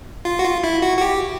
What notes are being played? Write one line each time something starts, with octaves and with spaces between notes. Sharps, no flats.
F4
F#4
F4
E4
F#4
F#4
G4